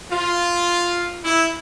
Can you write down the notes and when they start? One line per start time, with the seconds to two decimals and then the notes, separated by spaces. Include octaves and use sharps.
0.11 F4
1.24 E4